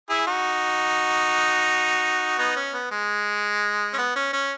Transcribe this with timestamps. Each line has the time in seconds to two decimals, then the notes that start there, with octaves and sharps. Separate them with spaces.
0.10 E4 G#4
0.27 D#4 F#4
2.39 B3 D#4
2.56 C#4
2.74 B3
2.91 G#3
3.93 C#4
3.98 B3
4.16 C#4
4.33 C#4